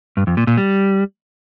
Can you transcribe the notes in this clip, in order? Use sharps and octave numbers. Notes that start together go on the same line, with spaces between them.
G2
F2
A#2
A#2
G3